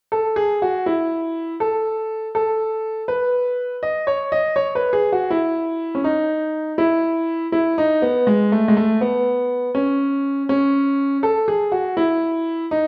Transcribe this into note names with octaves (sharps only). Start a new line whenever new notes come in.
A4
G#4
F#4
E4
A4
A4
B4
D#5
C#5
D#5
C#5
B4
G#4
F#4
E4
C#4
D#4
E4
E4
D#4
B3
G#3
A3
G#3
A3
B3
C#4
C#4
A4
G#4
F#4
E4
D#4